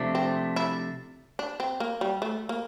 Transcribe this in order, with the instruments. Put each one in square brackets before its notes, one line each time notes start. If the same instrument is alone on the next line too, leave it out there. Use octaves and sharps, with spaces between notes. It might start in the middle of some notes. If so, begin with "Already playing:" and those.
Already playing: [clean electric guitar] C3 F3 A3 D4
[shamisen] C4
E4
D4
C4
A#3
G3
A3
A#3